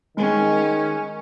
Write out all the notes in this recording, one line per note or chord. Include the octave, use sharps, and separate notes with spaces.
D#3 G#3 C#4